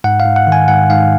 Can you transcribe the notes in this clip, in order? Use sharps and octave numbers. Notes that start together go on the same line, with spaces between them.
G#2 F#5
F5
G#2
F#5
D#3
G#5
G#2 F#5
G#2 F5